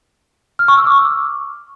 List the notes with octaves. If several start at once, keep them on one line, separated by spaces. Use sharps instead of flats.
F6
C#6
E6
D6